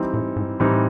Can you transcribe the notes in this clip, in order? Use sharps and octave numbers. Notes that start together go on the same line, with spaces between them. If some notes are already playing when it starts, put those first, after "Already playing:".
Already playing: E3 G3 C4 D#4
A2
G#2
A2 E3 G3 C4 D#4